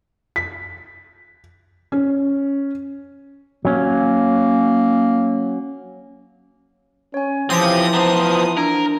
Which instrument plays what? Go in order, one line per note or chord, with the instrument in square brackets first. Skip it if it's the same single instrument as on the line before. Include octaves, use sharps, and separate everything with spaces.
[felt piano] B6
C#4
[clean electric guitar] F#3 C#4 [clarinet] A#3
[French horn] C#4 [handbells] C#5 G#5
[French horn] E3 [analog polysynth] F3 D#6 [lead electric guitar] C4 G4
[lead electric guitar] B3 C5 [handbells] A5 A#5 C6
[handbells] D4 [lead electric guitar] A#4